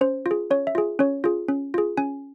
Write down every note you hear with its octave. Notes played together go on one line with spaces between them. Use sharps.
C#4 C5
F4
G#4
C#4 C#5
E5
F4 G#4
C#4 C#5
F4 G#4
C#4
F4 G#4
C#4 G#5